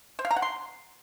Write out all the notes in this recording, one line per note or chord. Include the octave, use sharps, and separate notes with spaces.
C5
F5
A#5
F#5
C6